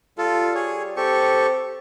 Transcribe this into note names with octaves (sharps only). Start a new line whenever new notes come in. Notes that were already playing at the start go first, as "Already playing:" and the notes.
G3 F4 A4
G#4 C#5
C4 G4 A4 C#6